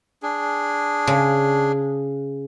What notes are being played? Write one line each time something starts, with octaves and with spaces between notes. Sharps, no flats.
D4 G#4
C#3